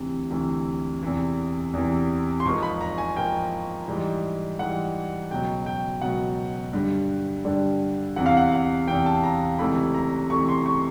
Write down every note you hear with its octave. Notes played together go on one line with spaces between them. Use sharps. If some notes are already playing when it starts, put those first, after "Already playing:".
Already playing: D2 C3 E3
D2 C3 E3
E2 C3 E3
E2 C3 E3
C6
G#2 F3 A#3 C#6
B5
A#5
G#5
G#2 F3 A#3 G5
G#2 E3 G3
G#2 E3 G3 F#5
C#2 B2 F#3 G5
G5
C#2 B2 F#3 F#5
G2 D3 G3
G2 D3 G3
E2 C3 E3 F#5
F5
F#5
F#5
E2 C3 E3 G5
A5
A#5
C#2 C3 E3 A3 B5
A#5
C#2 C3 E3 A3 C#6
C6
C#6